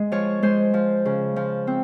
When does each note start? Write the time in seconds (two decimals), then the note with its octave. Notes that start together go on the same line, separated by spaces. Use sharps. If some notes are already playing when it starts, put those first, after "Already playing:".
Already playing: G#3
0.12 F3 C#5
0.42 G#3 C5
0.74 F3
1.05 C#3
1.36 F3
1.67 C4